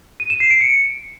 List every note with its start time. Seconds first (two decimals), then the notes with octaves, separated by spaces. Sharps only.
0.20 D#7
0.30 E7
0.40 C7
0.51 D7
0.61 C#7